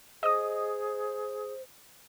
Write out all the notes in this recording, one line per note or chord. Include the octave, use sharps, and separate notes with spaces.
G#4 C5 D#5 D#6